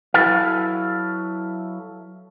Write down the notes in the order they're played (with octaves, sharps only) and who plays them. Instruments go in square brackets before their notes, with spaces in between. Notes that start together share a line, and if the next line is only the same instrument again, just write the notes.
[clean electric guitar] F#3 E4 A4 B4 F5